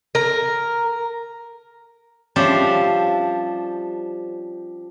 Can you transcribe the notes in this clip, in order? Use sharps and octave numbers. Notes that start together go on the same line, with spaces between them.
A#4
F3 G3 C#4 D4 C5 E5